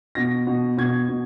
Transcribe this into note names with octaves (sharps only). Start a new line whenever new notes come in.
B2 A#6
B2
B2 G#6
B2